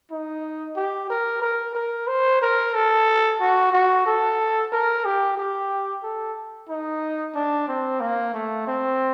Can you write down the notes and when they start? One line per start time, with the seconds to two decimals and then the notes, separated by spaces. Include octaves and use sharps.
0.11 D#4
0.76 G4
1.10 A#4
1.42 A#4
1.75 A#4
2.07 C5
2.42 A#4
2.74 A4
3.40 F#4
3.72 F#4
4.06 A4
4.72 A#4
5.05 G4
5.37 G4
6.03 A4
6.69 D#4
7.35 D4
7.68 C4
8.00 A#3
8.34 A3
8.67 C4